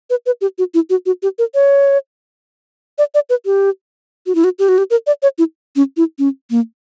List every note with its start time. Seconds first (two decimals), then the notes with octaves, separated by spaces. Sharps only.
0.10 B4
0.26 B4
0.41 G4
0.58 F#4
0.74 E4
0.90 F#4
1.06 F#4
1.23 G4
1.39 A#4
1.54 C#5
2.98 D5
3.15 D5
3.30 B4
3.46 G4
4.26 F#4
4.35 E4
4.44 F#4
4.59 G4
4.69 F#4
4.78 G4
4.90 A#4
5.07 D5
5.23 C#5
5.38 E4
5.76 C#4
5.97 E4
6.19 C#4
6.50 A#3